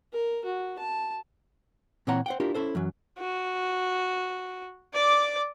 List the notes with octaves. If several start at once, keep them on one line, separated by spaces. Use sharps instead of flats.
A#4
F#4
A5
A#2 E3 C4 C#5 F#5 A#5
C5 F#5 G5
D4 E4 F4 G4 A#4
C#4 E4 A4 C5
F#2 E3 F#3
F#4
D5 D6